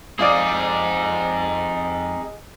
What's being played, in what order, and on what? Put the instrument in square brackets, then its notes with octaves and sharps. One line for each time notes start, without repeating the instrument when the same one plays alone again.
[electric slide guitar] F3 C4 [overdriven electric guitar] D#4 G#4 [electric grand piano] D5 F5 D#6